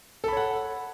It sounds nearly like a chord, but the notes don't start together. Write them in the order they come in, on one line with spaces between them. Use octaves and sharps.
A4 B5 C#5 F#5